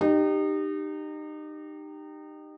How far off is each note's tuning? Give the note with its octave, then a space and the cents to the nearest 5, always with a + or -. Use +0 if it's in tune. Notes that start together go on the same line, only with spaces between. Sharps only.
D#4 -30 G4 +0